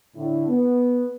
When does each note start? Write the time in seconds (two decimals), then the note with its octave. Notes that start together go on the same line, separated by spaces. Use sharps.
0.15 A2 D3
0.48 B3